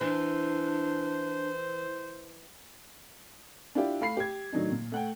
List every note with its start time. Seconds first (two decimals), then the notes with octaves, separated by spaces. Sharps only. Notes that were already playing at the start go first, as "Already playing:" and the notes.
0.01 E3 D4 C5
3.75 D4 E4 F4 G4
4.01 A3 F5 B5 C7
4.17 G4 G#6
4.52 A2 D#3 F#3 D4 D#4
4.72 A#2
4.92 A3 F#5 G5